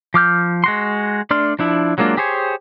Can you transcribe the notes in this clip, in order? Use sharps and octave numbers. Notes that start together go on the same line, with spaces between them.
F3 D6 F6 G6
G#3 F#4 C6
A3 D4 D5 C6 F6
F3 D4 E4
F#3 G#3 A#3 D4 F4
G4 G#4 C5 C#5 G#5